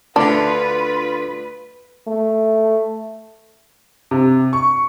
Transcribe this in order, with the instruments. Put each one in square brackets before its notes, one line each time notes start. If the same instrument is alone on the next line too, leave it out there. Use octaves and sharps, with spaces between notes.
[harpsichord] D2 D3 [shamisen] D4 [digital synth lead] F4 [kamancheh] B4
[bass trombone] A3
[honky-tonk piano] C3
C#6